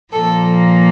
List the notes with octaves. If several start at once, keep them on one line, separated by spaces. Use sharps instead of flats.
A#2 F3 A#3 A4